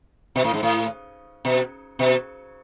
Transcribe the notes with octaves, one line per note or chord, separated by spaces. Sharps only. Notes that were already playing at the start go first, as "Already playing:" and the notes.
B2
A2
G#2
A2
B2
B2